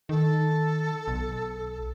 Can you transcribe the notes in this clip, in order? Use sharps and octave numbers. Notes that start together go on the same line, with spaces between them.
D#3 A4
B1